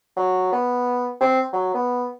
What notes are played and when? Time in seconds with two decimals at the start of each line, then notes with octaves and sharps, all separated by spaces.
0.17 F#3
0.52 B3
1.21 C4
1.53 F#3
1.74 B3